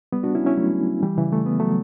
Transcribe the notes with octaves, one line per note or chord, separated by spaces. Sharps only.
G3 B3
D4 F#4
C#4 E4
C#4 E4
F#3 A3
E3 G3
C#3 E3
A3
B3
F#3 A3